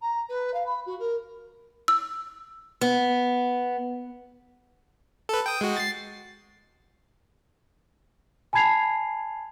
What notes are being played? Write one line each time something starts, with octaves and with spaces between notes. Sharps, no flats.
A#5
B4
F5
B5
F#4
A#4
E6
B3
A4 B4
G5 D#6
G#3 F#4
A6 C7
G#5 A5 B5 G#6 C7 F7